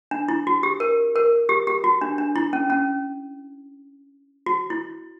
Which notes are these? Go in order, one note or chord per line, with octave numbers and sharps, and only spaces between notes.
D4
E4
F#4
G4
A#4
A#4
G4
G4
F#4
D4
D4
E4
C#4
C#4
F#4
E4